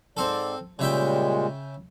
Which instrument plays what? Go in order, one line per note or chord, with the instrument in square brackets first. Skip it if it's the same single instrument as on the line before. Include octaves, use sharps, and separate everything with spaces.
[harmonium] G#2 D5 [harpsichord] C4 A4
[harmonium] A#2 G3 G#3 [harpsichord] C#3 E5 G5